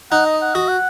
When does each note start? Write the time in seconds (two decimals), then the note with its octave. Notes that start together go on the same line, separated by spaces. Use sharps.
0.11 D#4 F#5
0.26 D#5
0.41 F#5
0.55 F#4 D#5
0.68 F#5